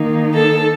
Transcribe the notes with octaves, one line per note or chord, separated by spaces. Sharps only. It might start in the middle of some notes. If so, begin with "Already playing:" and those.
Already playing: D#3 A#3 D#4
A4